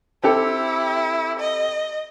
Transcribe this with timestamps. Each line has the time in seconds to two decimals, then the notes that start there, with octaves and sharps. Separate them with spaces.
0.23 C4 E4 G4 A4
1.39 D#5